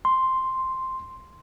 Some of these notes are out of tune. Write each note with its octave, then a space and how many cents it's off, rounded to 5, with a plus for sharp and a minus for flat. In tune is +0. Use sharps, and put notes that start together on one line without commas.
C6 +0